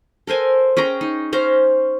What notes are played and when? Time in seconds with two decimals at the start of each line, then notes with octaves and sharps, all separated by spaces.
0.27 A4 A#4 C5 G#5
0.77 C#4 G#4 G5 A#5
1.01 D#4
1.33 C#4 C5 F5 A#5